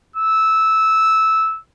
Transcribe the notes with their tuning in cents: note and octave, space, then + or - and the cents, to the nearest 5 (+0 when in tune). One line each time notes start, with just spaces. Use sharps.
E6 -10